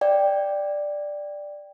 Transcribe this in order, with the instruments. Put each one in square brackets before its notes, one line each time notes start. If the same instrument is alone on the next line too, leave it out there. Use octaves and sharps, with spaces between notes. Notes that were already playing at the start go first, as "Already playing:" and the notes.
[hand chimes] D5 G5